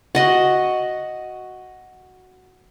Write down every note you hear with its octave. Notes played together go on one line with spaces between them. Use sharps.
F#4 D#5 F#5